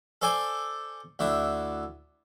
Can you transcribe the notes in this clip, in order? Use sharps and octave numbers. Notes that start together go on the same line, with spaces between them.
A4 C5 D5 G#5 D6
D2 D4 E4